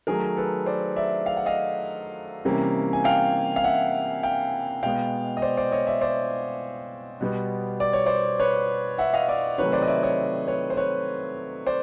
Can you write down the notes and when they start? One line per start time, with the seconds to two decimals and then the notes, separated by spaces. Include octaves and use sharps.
0.07 D#3 F#3 A3 G#4 A#4
0.37 A4 B4
0.66 C5 D5
0.96 D5 E5
1.26 F5
1.37 F#5
1.46 D#5 F5
2.45 C3 E3 G3 A#3 C#4
2.93 G#5
3.04 F5 G5
3.56 F5
3.64 E5 F#5
4.23 F5 G5
4.83 B2 G#3 B3 F5 G5
5.37 D#5
5.42 C5 D5
5.57 C5 D5
5.72 C#5 D#5
5.87 D5 E5
6.01 C5 D5
7.21 B2 G3 B3
7.80 D5
7.93 C#5
8.06 C5 D5
8.39 B4 C#5
8.98 E5 F#5
9.14 D#5 F5
9.29 D5 E5
9.58 C3 D#3 F#3 A3 B4 C#5
9.73 C5 D5
9.82 D#5
9.88 D5 E5
10.03 C#5 D#5
10.48 B4 C#5
10.70 C5
10.77 B4 C#5
11.66 C5 D5